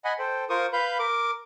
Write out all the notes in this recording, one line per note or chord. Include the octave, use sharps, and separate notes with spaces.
D#5 F#5 G#5 B5
A4 C5 G5
F4 A#4 C5 C#6 D#6
B4 F5 B5 G6
A#4 D6